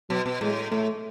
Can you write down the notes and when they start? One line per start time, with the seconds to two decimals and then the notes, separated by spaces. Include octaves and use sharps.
0.09 B2 F#3
0.26 B2
0.41 A2 G#3
0.71 A2 A3